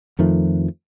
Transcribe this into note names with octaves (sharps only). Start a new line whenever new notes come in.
F2 D#3 F3 A3